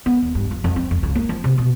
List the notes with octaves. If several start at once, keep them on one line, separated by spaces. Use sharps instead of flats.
B3
D#2
G2
F3
F2
C4
F2
C#2
A#3
F3
C3
B2